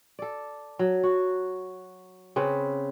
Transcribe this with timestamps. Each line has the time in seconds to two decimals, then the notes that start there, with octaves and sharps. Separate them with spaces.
0.19 A4 D5
0.79 F#3
1.04 F#4
2.36 C#3 C4 B4